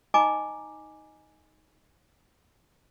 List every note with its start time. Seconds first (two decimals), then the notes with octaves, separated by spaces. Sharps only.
0.14 D#4 D#5 G#5 A#5 D6